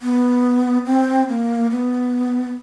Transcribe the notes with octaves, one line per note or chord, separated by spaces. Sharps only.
B3
C4
A#3
B3